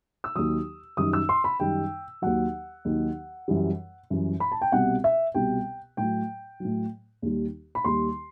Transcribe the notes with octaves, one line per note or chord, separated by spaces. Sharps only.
E6
D#2 D#3 F#3 D#6
F#2 D#3 G3 D#6
E6
C6
B5
F#2 D#3 G3 G5
D#2 D#3 F#3 F#5
D#2 D#3 F#3
F#2 E3 G3
F#2 E3 G3
B5
A5
G5
C2 B2 G3 F#5
E5
C2 B2 G3 G5
A2 F#3 G5
A2 F#3
D#2 D#3 G3
B5
D#2 D#3 G3 C6